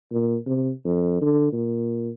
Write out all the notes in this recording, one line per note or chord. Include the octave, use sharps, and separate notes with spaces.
A#2
C3
F2
D3
A#2